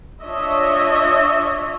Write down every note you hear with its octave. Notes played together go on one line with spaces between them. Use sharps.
D4 F4 C#5 D#5 E5